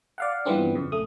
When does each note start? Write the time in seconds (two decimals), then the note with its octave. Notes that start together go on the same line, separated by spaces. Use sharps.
0.18 D5 F5 F#5
0.45 G2 E3 F3 B3 C4 D4
0.75 F2 C#3
0.92 A#1 A3 D#6